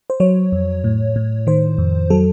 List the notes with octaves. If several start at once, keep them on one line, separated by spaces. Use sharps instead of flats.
C5
F#3 C#5
F2
A2
A2
D#3 C5
F2
F#3 A4